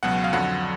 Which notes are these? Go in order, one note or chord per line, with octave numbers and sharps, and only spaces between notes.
C#2 B2 F#3 F#5
F5
F2 D3 F#3 F#5